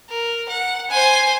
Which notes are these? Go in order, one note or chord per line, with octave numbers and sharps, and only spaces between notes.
A#4
F#5
C5 G#5